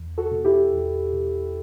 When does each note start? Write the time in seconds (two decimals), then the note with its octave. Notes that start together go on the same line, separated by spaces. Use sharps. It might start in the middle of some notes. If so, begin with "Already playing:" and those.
Already playing: E2
0.18 F#4 A4
0.31 B2
0.45 E4 G4
0.73 E2
1.13 B2